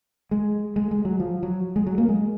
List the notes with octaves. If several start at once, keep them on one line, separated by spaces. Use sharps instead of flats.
G#3
G#3
G#3
F#3
F3
F#3
G#3
F#3
A#3
G#3